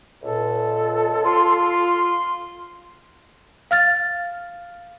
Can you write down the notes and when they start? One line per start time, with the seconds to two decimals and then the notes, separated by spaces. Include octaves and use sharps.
0.23 C#2 A#2 A4
1.25 F4 C6
3.71 F5 F6 A6